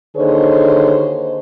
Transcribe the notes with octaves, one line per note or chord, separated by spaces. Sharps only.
D#2 D3 D#4 G#4 C5 C#5